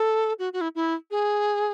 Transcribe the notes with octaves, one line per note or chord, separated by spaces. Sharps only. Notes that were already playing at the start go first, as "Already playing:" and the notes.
Already playing: A4
F#4
F#4
E4
E4
G#4